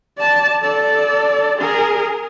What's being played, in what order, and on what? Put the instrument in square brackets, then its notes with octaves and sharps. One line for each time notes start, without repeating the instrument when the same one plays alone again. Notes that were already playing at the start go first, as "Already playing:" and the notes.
[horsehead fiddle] D5 A5
A4 D5
G#4 A#4